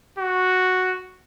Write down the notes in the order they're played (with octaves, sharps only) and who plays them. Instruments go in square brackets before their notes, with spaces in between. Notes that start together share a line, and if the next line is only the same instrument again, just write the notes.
[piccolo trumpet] F#4